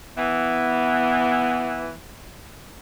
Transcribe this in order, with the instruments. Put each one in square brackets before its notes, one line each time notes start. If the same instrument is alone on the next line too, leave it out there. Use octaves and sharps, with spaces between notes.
[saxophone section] E3 [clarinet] B3